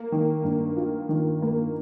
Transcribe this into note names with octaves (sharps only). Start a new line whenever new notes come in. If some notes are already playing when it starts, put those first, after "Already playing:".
Already playing: A#3
D#3
G2
F4
D#3
A#3